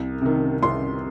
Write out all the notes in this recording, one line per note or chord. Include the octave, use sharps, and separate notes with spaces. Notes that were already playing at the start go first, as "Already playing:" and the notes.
Already playing: C2
C3 D#3
C2 C6